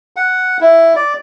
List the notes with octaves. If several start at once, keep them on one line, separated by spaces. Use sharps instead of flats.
F#5
E4
D5